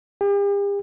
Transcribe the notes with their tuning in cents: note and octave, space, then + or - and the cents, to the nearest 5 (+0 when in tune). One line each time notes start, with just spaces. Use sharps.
G4 +45